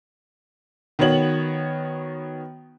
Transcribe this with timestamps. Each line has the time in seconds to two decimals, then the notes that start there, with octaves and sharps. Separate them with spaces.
0.99 D#3 B3 F#4 C#5 F#7